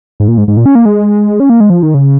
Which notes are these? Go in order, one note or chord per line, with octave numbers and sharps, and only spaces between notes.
G#2
A#2
G#2
G#2
A#2
C#4
A#3
G#3
C#4
A#3
G#3
F3
D#3
C#3